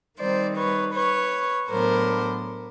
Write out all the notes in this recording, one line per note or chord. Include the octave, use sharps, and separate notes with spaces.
D#3 G3 C4 D#4 C5 D5
B4 C#5
B4 C#5
A2 F#3 B3 D4 A#4 C5